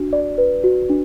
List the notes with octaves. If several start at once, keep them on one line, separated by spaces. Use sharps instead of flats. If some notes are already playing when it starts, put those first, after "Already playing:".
Already playing: D4 F#4
D5
B4
F#4
D4